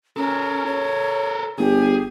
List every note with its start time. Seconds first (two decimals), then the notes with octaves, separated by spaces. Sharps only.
0.17 C#4 A4 A#4
0.66 C#5
1.58 G1 G4 G#4